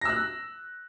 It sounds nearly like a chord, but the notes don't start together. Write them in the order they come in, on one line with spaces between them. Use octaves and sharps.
A#6 E6 F#6